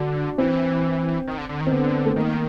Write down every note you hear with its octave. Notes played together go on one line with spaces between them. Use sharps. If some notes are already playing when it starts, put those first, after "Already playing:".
Already playing: D3 D4 F#4
E3 C4
D#3
D3
D3
D#3
C4
D3 B3
A3
D#3 A#3